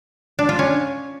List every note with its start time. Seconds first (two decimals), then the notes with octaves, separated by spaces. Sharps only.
0.39 D4
0.49 F4
0.59 C#4